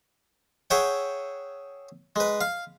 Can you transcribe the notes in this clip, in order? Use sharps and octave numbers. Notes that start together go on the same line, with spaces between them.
G#4 C#5 E5 F#5 G5
G#3 B4
F5